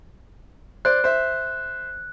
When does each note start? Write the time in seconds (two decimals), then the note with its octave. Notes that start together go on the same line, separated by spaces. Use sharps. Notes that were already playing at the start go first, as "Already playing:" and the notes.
0.85 C5 D5 F#6
1.04 C5 E5